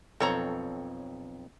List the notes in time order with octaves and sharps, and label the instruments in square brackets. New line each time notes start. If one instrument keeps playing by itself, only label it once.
[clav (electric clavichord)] B1 F2 C4 [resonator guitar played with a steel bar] A4 C#5 A#5